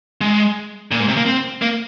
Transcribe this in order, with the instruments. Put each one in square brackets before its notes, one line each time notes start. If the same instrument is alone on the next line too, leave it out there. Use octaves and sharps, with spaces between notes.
[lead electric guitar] G#3
A#2
G#2
C3
A#3
C4
A#3